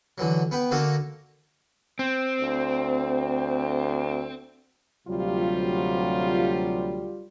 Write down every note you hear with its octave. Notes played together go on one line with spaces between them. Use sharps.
D3 E3 F#3
B3 B4 G5
D3 A#3 F#4 A4 A#4
C4
D2
D2 C3 F#3 G3 F4